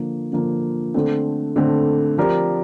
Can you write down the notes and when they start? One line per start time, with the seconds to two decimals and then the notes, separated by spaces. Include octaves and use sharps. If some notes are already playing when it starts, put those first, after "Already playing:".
Already playing: D3 F3 A#3
0.32 D3 F3 A#3
0.94 D3 A3 C4
1.56 D3 A3 C4
2.18 F3 C4 G4 A#4 D5